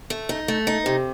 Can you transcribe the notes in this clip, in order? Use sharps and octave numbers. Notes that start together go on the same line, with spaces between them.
A3
D#4
A3
D#4
C3